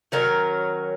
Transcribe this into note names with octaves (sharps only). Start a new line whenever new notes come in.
D#3 F#3 C#4 A#4